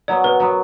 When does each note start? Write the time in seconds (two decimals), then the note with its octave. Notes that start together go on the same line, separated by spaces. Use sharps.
0.08 F#3 B3 D5
0.24 B2 B4
0.40 F#3 B3